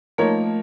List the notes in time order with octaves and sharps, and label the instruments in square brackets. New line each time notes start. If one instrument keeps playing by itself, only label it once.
[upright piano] F3 A#3 D#4 A#4 C#5 [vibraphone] A3